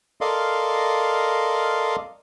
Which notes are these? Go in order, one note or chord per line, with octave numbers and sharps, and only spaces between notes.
A4 A#4 D5 D#5 F5 C6